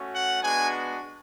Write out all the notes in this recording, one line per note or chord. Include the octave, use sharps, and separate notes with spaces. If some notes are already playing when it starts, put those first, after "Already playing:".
Already playing: A3 C#4 F#4
F#5
G#3 B3 D4 F#4 G#5